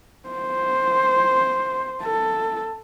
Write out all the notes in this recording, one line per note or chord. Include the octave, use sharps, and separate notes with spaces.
C5
A4